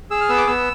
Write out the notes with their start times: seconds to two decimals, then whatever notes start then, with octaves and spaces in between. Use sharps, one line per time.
0.11 G#4 E6
0.21 F6
0.29 B3 E6
0.38 D6
0.47 B3 E6